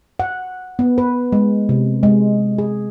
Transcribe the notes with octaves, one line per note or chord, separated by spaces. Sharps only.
F#5
B3
B4
G#3
C3
G#3
G#4